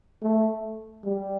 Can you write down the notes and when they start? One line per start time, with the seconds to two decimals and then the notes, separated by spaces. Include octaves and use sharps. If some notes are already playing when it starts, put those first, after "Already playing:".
0.22 A3
1.04 G3